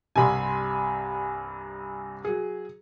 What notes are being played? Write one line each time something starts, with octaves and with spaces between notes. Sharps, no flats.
C2 G2 C3 G#5 B5 C6
F#3 G#4